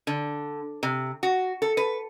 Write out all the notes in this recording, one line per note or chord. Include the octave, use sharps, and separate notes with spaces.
D3
C3
F#4
A4
B4